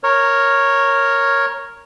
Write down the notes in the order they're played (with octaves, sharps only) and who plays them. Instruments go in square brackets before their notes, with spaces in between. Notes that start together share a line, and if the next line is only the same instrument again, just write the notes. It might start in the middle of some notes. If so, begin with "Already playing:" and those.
[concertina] A#4 C#5